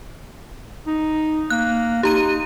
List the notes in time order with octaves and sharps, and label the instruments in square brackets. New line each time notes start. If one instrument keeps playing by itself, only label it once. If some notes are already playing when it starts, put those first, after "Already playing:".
[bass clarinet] D#4
[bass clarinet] A#3 [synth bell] F#6
[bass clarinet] D#4 [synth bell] G4 A#5 D#7